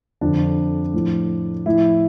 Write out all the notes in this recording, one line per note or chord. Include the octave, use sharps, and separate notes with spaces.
F2 D3 F3 D4
A2 F3
A2 F3 E4